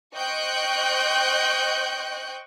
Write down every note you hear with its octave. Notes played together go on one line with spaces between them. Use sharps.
C5 D#5 G5 C#6 F#6 G6